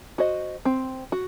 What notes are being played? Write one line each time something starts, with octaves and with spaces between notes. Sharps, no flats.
F#4 C5 D#5
C4
F#4